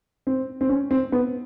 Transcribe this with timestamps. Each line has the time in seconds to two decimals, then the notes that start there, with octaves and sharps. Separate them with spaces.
0.27 C4
0.61 C4
0.69 C#4
0.91 C4
1.12 B3